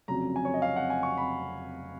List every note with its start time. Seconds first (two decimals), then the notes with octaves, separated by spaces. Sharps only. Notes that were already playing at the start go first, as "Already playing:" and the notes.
0.08 F1 F2 C#3 F#3 A#5
0.36 G#5
0.45 C#5
0.54 D#5
0.62 F5
0.76 F#5
0.90 G#5
1.03 C#6
1.18 B5